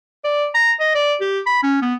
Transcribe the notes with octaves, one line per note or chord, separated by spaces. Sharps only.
D5
A#5
D#5
D5
G4
B5
C#4
B3